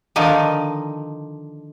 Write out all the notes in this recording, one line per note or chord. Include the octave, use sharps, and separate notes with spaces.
D3 D#3 F3 D#4